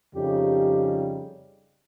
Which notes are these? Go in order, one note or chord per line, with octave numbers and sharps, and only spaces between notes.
F2 C#3 G3 D#4 G4